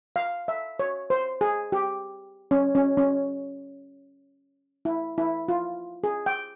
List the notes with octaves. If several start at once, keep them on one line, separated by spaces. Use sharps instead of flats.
F5
E5
C#5
C5
G#4
G4
C#4
C#4
C#4
E4
E4
F4
G#4
G5